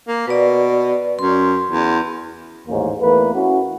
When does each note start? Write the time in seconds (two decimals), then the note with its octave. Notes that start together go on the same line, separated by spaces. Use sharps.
0.08 A#3
0.27 B2 B4 D5
1.19 F#2 C6
1.71 E2
2.68 A1 D#2 G#2 A#3 C#4
3.01 E2 A3 A#3 B4
3.34 C#4 E4 F#4